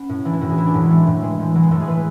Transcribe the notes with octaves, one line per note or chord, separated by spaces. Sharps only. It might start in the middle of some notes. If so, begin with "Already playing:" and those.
Already playing: B3 C#4
A2
E3 D4
E4
A2 F#4
G#4
E3 E4
D4
A2 F#3
G#3
E3 A3
A2
E3 G#3
A2
E3 F#3
G#3
A2 A3
G#4
E3 B4